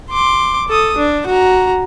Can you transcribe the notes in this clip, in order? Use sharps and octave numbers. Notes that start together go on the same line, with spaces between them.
C6 D6
A4 D#6
D4
F#4 A#5